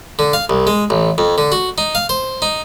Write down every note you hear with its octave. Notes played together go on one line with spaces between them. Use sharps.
D3
F5
C2
G#3
A1
F2
D3
F#4
D#4
F5
C5
D#4